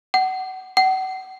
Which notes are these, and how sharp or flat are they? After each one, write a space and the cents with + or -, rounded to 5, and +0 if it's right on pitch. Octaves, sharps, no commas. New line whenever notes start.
F#5 +25
F#5 +35